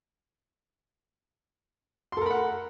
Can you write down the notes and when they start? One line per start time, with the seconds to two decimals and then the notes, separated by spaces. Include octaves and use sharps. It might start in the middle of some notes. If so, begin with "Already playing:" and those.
2.12 C6
2.17 A4
2.21 A#4
2.26 B5
2.31 F#5